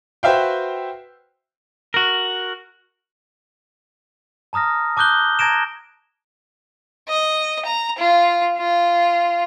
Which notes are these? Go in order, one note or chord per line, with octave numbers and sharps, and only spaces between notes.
F#4 B4 C5 E5 F5 G5
F#4 A#4
A5 A#5 D#6 F6 A#6
A5 D6 D#6 F#6 G6 G7
A5 A#5 G#6 A#6 D7 E7
D#5
A#5
F4
F4